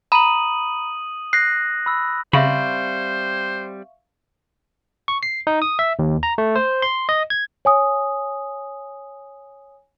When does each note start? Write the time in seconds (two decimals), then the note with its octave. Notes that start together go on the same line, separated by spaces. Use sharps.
0.12 A#5 B5 D#6 D#7 F#7
1.33 F#6 A#6 C7
1.86 B5 E6
2.33 C#3 G3 C4 C5 E5 F5 B5 C#6
5.08 C#6
5.23 C7
5.47 D#4
5.62 D#6
5.79 E5
5.99 D#2
6.23 A#5
6.38 A3
6.56 C5
6.82 C6
7.09 D#5
7.30 G#6
7.65 C#5 G#5 D#6